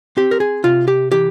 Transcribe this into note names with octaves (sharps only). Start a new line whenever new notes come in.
C4 G4
A#4
G#4
C3 F4
G4
E3 G4